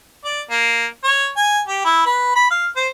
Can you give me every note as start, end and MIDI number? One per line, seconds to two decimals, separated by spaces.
0.25 0.41 74
0.50 0.86 58
1.04 1.28 73
1.37 1.60 80
1.68 1.81 67
1.85 2.01 64
2.06 2.35 71
2.35 2.48 83
2.50 2.67 77
2.76 2.88 72